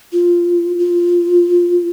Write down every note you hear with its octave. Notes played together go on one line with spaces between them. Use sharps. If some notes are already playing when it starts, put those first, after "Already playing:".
F4
F4